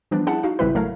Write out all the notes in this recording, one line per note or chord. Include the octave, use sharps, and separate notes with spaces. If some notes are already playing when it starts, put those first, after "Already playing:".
E3 F3 G3 B3 D4
C#4 E4 G#4 F#5 A5
D#4 F#4 F5
A1 C#3 G3 C4 E4 B4
A1 F#3 A3 A#4 C#5 F5